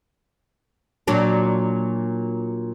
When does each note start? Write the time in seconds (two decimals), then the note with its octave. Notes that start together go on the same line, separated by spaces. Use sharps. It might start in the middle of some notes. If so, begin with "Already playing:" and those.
1.08 A#2 F#3 D4